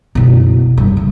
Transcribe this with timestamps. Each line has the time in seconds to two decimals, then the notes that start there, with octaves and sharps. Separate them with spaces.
0.15 F#1 B2
0.77 G2
0.97 C#3